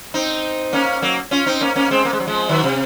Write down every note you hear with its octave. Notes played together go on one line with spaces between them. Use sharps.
C4 D#4
A#3 C#4
F#3 A#3
C#4 F4
C4 D#4
A#3 C#4
A#3 C#4
G#3 C4
A#3
G#3
F#3
F3 G#3
D#3 F#3
C3